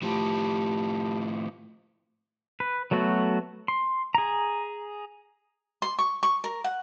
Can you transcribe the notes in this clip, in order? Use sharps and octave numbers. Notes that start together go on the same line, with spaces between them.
A2 F3 G4 A5 B5
B4
F#3 A3 B3 F#4
C6
G#4 A#5
C6
C#6
C#6
A#4
F#5